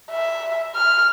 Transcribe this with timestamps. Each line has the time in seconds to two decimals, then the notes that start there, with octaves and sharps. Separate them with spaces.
0.11 E5
0.75 F6